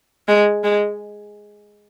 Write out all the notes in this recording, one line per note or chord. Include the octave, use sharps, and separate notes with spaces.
G#3
G#3